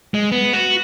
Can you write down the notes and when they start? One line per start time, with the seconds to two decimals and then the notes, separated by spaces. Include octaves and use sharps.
0.14 G#3
0.31 B3
0.53 F#4